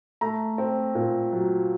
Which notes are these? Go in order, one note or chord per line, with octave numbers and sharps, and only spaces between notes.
A3 A#5
C4
A#2
F#3